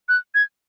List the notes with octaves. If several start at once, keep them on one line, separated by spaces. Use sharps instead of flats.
F#6
G#6